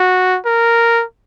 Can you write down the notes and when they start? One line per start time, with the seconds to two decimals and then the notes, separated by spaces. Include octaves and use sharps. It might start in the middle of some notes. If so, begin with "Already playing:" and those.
Already playing: F#4
0.45 A#4